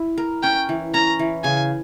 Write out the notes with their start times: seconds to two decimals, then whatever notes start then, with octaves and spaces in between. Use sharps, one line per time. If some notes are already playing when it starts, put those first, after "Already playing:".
Already playing: E4
0.18 A#4
0.43 C#4 G5
0.69 E3
0.94 C#4 A#5
1.19 E3
1.44 C#3 G#5